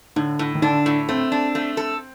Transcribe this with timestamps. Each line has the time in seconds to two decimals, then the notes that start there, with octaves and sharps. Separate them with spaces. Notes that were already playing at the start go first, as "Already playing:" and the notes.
0.16 A2 D3
0.39 A2
0.55 D#3
0.62 D3 D4
0.86 A2
1.08 A3 C4
1.32 D4
1.55 A3
1.77 A4